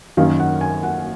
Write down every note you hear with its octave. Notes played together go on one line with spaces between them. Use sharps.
F#2 D#3 A#3 C#4 F5
F#5
G#5
F#5